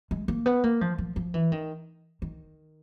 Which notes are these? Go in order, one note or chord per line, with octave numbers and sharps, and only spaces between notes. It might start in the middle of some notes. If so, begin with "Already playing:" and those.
G#3
A#3
B3
A#3
F3
F3
F3
E3
D#3
D#3